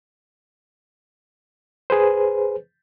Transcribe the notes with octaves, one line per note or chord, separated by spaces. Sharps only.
G#4 B4 C5